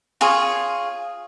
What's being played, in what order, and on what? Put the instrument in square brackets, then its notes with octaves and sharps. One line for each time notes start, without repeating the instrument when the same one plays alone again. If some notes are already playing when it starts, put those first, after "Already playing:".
[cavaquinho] F4 G#4 C#5